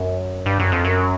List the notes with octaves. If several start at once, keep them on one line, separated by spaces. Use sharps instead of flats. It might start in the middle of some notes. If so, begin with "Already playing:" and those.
Already playing: F#2
G2
F#2
F2
F#2